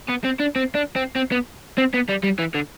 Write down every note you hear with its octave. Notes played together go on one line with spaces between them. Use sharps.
B3
C4
D4
C4
D4
C4
C4
B3
C4
B3
G3
G3
E3
D3